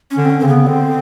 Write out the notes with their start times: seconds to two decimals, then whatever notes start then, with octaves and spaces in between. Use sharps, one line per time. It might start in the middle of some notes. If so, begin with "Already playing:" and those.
0.11 C#4
0.17 D3
0.25 C4
0.30 C#4
0.40 C#3 C4
0.48 B3
0.67 D3 C4